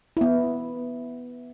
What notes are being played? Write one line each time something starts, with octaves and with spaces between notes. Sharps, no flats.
B3 E4